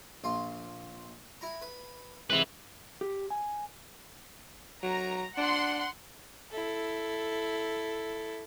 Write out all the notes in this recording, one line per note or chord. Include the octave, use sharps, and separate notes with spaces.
A#1 F4 C6
E4 A#5
B4
G#2 C3 E4 B4
G4
G#5
F#3 A#5
D4 F#5 C6
E4 A4